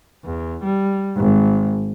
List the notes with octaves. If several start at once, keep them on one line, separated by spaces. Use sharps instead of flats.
E2
G3
G#1